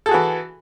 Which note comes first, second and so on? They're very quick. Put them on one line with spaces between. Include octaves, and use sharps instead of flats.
A4 G#4 F#4 E3